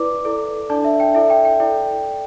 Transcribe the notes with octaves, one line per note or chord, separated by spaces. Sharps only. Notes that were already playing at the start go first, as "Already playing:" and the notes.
Already playing: E4 B4 D5 D6
E4 A4 D5
D4 A4 D5 A5
E5
G5
E4 A4 D5 E5
G5
G5
E4 A4 D5 G5